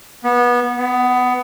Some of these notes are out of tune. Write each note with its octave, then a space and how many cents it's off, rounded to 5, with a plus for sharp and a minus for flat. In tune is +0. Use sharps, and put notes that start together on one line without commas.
B3 -25
B3 +15